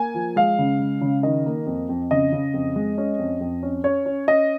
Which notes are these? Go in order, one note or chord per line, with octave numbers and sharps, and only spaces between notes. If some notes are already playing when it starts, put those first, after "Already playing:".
Already playing: A#3 G#5
F3
G#3 F5
C#3
G#3
C#3
D#3 D#5
A#3
F2
F2
C#3 D#5
C#3
F2
G#3
C#4
F2
F2
C#4
C#4 C#5
C#4
C#4 D#5